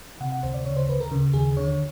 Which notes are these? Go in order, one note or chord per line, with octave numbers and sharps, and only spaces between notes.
C3 F#5
F#5
D2 C5
D5
C#3 C#5
C5
D2 B4
A#4
C#3
D#2 G#4
D3 C#5